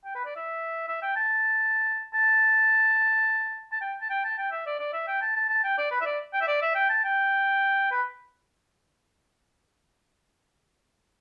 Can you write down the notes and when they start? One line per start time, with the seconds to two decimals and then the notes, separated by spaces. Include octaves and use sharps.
0.05 G5
0.15 B4
0.25 D5
0.36 E5
0.88 E5
1.02 G5
1.16 A5
2.14 A5
3.72 A5
3.81 G5
4.01 A5
4.10 G5
4.24 A5
4.38 G5
4.51 E5
4.66 D5
4.80 D5
4.93 E5
5.08 G5
5.22 A5
5.36 A5
5.49 A5
5.64 G5
5.78 D5
5.91 B4
6.01 E5
6.06 D5
6.33 G5
6.41 E5
6.48 D5
6.62 E5
6.75 G5
6.90 A5
7.04 G5
7.92 B4